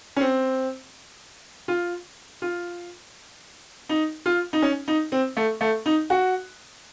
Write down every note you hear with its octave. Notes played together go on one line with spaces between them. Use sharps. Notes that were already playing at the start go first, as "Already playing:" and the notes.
C#4
C4
F4
F4
D#4
F4
D#4
C#4
D#4
C4
A3
A3
D#4
F#4